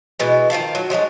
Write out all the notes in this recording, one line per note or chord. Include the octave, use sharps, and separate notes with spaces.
B2 E3 G#3
D#3 F3 F5 A5
F#3
F3 F#3 G#3 D#4